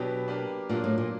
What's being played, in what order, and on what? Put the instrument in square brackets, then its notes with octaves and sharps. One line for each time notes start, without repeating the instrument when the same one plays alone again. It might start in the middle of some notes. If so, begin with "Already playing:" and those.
Already playing: [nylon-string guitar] B2 [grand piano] F#3 B3 D4 G4
[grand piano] A#3 D4 G4 B4
[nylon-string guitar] A#2 [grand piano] F#3 A#3 D4 F4
[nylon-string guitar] A2
A#2